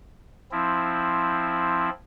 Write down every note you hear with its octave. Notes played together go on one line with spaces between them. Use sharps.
F3 C4 E4